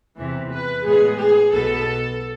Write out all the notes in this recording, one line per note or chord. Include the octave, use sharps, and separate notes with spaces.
E2 C3 E3
B4
A2 G#3 B3 G#4
G#4
B1 B2 B3 A4